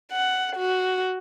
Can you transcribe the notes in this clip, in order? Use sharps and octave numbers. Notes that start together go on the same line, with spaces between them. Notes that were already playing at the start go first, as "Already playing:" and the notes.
F#5
F#4